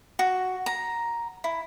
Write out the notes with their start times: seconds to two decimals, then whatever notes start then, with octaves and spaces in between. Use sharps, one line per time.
0.19 F#4
0.66 A#5
1.44 E4